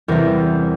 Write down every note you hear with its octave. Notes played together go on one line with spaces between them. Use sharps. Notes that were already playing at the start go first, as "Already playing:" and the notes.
E2 C3 E3 G3 C4 A#4